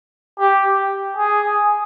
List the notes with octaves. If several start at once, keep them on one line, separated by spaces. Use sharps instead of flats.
G4
G#4